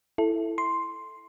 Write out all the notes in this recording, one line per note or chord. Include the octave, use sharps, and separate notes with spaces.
E4 A4
C6